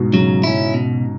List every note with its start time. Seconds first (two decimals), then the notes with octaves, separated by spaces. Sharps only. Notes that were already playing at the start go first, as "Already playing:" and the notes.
Already playing: G#2 B2
0.13 C#3 F#3
0.44 C#4 E4
0.74 B2